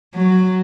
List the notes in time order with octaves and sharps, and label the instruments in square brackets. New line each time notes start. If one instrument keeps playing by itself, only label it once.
[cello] F#3